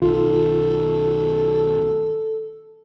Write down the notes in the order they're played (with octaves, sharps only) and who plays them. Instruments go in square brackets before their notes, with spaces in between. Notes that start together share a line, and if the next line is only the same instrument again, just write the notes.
[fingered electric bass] B1 D#3 [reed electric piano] F4 [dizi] A4